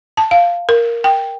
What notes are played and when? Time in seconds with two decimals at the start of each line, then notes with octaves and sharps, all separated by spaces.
0.17 A5
0.31 F5
0.69 A#4
1.04 G5